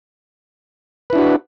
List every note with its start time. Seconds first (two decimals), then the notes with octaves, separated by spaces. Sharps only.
1.10 B4
1.13 E4
1.15 D4
1.18 F#4